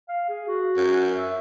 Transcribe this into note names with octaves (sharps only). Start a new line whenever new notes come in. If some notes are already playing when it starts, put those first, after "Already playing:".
F5
G#4
F#4
F#2
E5